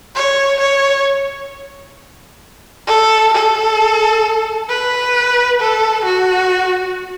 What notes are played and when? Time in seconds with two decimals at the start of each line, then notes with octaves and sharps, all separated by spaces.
0.15 C#5
0.60 C#5
2.87 A4
3.33 A4
4.69 B4
5.60 A4
6.05 F#4